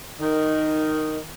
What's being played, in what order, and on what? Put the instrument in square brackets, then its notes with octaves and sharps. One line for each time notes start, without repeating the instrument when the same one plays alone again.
[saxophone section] D#3